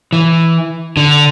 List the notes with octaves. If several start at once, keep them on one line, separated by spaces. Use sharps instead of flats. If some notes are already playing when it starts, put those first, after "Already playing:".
E3
D3